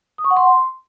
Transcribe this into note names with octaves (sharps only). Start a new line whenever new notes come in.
D#6
C#6
F#5
C6